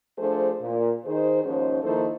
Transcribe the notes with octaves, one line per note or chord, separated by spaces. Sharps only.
F3 A3 D4 F4 G#4 C5
A#2
D#3 G#4 C5
D#2 G#2 F3 C#4 C5
D#3 F3 A#3 E4 A4 C5